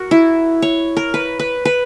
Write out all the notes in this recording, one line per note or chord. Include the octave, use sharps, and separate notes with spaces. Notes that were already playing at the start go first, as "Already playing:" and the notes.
Already playing: F#4 A#4
E4
C#5
A#4
B4
B4
B4